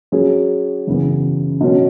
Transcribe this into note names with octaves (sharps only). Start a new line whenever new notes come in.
F#3 C#4 G#4
F#2 C#3 E3 B3
B2 F#3 C#4